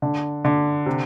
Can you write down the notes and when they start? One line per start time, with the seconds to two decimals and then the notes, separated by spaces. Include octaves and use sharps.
0.02 D3
0.45 D3
0.86 C3